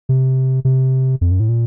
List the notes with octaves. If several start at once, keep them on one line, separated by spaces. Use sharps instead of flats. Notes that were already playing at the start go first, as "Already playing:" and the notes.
C3
C3
F2
F#2
A2
A#2